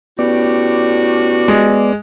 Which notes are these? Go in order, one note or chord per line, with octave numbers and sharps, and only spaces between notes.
A2 B3 C#4 F#4 G4 D5
G#3